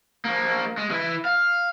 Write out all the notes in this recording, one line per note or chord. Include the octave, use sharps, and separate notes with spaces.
F3 A#3
G#3
E3 E4
F5